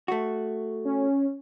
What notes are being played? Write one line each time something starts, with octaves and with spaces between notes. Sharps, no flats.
A3 F#4
C#4